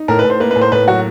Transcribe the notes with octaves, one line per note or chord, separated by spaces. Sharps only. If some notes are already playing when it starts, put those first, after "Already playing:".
Already playing: D#4
A2 A#4
B4
A2
C5
A#3 B4
B4
A2
C5
A2 B4
F#3 F#4